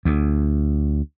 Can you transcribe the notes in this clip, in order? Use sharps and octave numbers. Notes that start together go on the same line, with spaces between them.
D2